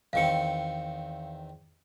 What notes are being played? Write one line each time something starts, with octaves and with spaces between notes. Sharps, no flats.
E2 D#3 C4 F5 C#7